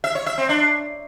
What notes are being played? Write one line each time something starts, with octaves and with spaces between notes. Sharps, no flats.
E5
C#5
E5
C4
D4